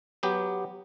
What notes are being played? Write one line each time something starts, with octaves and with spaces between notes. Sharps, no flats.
F#3 B3 G4